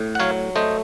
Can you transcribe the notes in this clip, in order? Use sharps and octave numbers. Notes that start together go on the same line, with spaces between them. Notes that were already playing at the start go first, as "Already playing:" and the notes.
Already playing: A2
F#5
F#3 C#5 F5
A3 C5 D#5